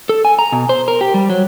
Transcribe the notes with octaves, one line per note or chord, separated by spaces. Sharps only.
A4
G#5
A#5
B2
C5
A#4
G4
G3
F#3